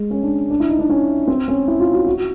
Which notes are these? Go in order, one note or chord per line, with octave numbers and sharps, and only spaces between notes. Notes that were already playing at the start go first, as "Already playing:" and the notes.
Already playing: G#3
C#4
D4
D4
E4
D#4
D4
C#4
C4
C#4
E4
F4
F#4
F#4